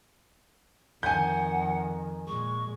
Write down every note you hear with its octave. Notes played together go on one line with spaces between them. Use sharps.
F2 D#3 F#5 G#5 G6
A#2 G#3 C#6